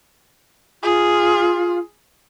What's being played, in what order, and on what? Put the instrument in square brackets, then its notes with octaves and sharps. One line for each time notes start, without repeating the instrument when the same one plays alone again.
[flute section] F4 [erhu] G#4